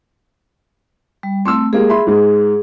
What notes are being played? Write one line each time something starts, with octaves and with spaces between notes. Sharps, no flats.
G3
A3 C4 C6 E6
G#3 A#3 G4 G#4
E5 B5 C6
G#2 G#3